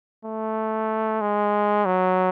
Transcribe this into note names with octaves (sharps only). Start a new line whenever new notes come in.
A3
G#3
F#3